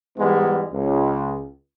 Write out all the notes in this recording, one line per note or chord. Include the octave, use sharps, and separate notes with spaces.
G#2 E3 G3 G#3 B3
C#2